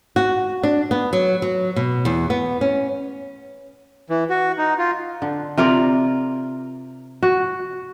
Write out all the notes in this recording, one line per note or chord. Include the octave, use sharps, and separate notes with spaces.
F#4
D4
B3
F#3
F#3
B2
E2
B3
C#4
E3
F#4
D#4
F4
D3
C3 F4 A#4 D5
F#4